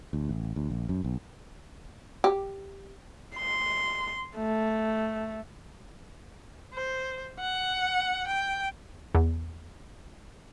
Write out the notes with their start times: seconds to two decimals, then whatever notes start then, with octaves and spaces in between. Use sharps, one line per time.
0.13 D2
0.29 A1
0.56 D2
0.70 A#1
0.89 F#2
1.04 B1
2.24 G4
3.37 C6
4.37 A3
6.74 C5
7.40 F#5
8.27 G5
9.15 E2